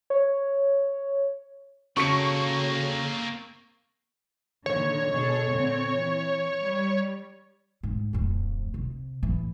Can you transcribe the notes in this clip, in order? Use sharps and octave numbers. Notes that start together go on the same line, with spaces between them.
C#5
C#3 A#3 C4 C#4 F#4 A4 C#6 C#7
A#2 D3 D#3 C#5
B2 G#4 A4
A#2 D3 C4
E3
G3
G#2
D1 F2
C3
A2 E3